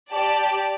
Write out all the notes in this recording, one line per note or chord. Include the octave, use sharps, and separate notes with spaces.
G4 D5 A5